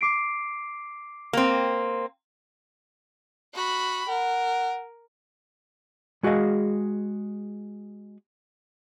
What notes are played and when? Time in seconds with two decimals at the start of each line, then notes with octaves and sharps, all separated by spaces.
0.01 D6 C7 D7
1.33 A#3 C4
3.54 F#4 B5
4.08 A#4 F#5
6.23 G#3 F#4 G#4 D#5 F5